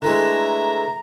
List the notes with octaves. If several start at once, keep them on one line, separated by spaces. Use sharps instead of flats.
D3 E3 G#3 A3 E5 A#5